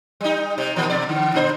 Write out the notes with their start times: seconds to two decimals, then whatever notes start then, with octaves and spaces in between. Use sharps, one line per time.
0.21 G3 D#4
0.58 C3
0.76 A#2 D#3 F3
0.90 B2 D5
1.09 D3
1.34 A#2 D4 C5